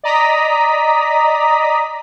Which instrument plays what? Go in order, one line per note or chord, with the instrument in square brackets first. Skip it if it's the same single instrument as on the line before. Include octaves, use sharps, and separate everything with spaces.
[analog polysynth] D5 D#5 A#5 D#6 B6